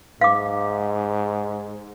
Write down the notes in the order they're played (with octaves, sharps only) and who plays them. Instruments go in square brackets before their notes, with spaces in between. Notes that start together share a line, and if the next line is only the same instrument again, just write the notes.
[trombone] G#2 [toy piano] F5 D6